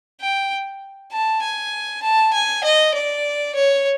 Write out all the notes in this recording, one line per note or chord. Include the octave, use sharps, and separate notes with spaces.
G5
A5
G#5
A5
G#5
D#5
D5
C#5